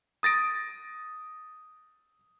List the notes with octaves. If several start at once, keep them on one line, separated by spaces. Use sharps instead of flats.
D#6 A6 A#6 D7